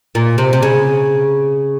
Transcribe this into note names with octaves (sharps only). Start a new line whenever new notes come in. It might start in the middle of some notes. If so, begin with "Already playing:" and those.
A#2
C3
C3
C#3